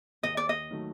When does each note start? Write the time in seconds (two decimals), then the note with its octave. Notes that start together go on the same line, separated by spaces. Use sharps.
0.23 D#2 D#5
0.37 D5
0.49 D#5
0.71 D#3 F#3 A3